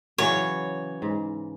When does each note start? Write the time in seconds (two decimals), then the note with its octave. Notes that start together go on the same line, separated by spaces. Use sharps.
0.18 C#3 E3 F#3 C#5
1.02 G#2